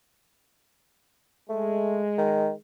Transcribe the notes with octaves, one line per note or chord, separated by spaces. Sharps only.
G#3 A3
D#3